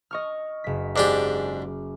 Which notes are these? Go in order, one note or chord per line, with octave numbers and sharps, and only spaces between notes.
D#5 C#6 F6
F#1 B6
G#2 D4 G4 D6